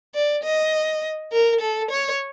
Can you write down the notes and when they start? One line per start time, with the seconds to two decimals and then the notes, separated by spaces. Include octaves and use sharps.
0.15 D5
0.44 D#5
1.33 A#4
1.61 A4
1.91 C#5